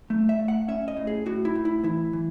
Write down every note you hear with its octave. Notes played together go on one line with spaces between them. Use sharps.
A3
E5
A3
F#5
C#4 E5
D#5
A2
G#4
A2 F#4
E4
A2
E4
E3 E4
E3